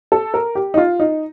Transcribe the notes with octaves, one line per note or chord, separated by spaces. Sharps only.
A4
A#4
G4
D#4
F4
D#4